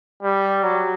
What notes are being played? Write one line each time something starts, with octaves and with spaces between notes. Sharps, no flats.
G3
F#3